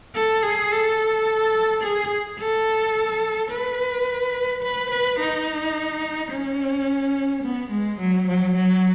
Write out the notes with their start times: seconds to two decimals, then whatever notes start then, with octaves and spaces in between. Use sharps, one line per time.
0.15 A4
0.43 G#4
0.71 A4
1.83 G#4
2.39 A4
3.51 B4
4.63 B4
4.91 B4
5.20 D#4
6.31 C#4
7.43 B3
7.71 G#3
8.00 F#3
8.27 F#3
8.55 F#3